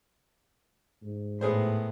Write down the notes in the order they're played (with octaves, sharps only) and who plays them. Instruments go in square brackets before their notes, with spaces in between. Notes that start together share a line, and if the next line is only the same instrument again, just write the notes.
[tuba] G#2
[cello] A2 [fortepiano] B3 G#4 C5